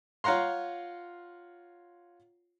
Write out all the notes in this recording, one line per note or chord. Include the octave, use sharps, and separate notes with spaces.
F4 C#5 F#5 A#5 C6